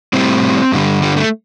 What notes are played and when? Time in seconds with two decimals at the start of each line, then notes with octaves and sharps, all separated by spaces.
0.13 A2 G3 C4
0.72 G2 D3 G3
1.02 G3
1.17 A3